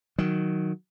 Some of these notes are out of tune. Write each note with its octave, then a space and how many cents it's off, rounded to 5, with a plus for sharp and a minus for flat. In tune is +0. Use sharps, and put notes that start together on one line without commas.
D#3 +0 F#3 +0